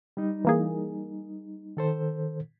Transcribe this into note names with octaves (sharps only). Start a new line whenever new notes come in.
G3 D#4
E3 A#3 G#4
D#3 A4 C5